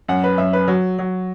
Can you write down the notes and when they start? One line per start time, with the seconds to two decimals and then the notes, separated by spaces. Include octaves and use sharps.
0.08 F#2 F#5
0.24 B4
0.38 F#2 E5
0.53 B4
0.68 F#3
0.99 F#3